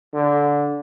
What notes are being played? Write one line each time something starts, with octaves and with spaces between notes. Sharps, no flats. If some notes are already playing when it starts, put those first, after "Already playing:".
D3